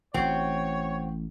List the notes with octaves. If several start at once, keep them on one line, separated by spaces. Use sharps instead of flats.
A1 C4 F#4 C#5